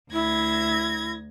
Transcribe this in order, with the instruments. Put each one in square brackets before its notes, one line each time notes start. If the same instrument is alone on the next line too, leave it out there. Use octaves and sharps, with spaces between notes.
[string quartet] D2 G#6 A#6 [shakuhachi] E4